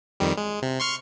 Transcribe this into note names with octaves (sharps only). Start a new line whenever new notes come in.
F2 D#3 G3
G#3
C3
C6 C#6 F6